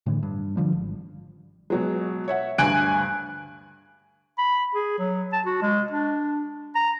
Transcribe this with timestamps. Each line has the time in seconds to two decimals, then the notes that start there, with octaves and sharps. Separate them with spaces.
0.06 A2 D3 E3
0.23 G2
0.57 D3 F3 G3
0.72 G#1
1.70 B2 F#3 G#3
2.28 C#5 E5 F#5
2.58 D2 G2 G#5 F#6 D7
4.38 B5
4.75 G#4
4.98 F#3
5.33 A5
5.46 F#4
5.62 G#3
5.91 D4
6.75 A#5